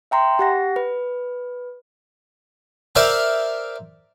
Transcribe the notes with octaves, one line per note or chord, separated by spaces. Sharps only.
E5 G5 A#5 C6
G4 F#5 A#6
B4
A#4 C5 D5 E5 F5 G5